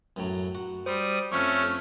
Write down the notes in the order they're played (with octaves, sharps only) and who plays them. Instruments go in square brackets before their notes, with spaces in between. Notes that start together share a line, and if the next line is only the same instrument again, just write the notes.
[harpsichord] F#2 A2 F#3
F#4
[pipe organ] G3 D#6 [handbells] C5
[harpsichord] F2 [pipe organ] A3 C#4 [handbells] C#6 F6